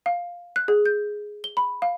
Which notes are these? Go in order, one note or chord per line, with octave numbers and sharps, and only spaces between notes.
F5
F#6
G#4
G6
G7
B5
F5